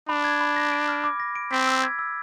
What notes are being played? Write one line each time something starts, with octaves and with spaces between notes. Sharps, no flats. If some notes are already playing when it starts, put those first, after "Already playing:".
D4 B5
G#6
B5
A#6
D7
F6
D6
A#6
D7
C4 B6
E6
G#6
E6